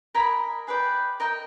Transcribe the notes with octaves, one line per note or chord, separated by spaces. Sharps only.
A#4 D#5 G#5 B5
G#4 B4 D5 G5
A#4 D#5 G5